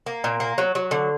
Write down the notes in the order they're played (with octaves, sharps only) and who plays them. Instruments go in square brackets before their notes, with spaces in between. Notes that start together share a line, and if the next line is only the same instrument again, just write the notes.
[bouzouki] A#3
A#2
A#3
F#3
F#3
D3